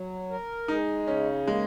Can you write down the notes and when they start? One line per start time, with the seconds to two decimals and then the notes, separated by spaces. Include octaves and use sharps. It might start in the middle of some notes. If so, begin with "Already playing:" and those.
Already playing: F#3
0.30 A#4
0.68 G#3 D#4
1.07 C#3 C#4
1.47 G#3 A#3